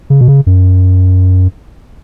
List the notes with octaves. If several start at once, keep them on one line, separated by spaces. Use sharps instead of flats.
C#3
B2
C#3
F#2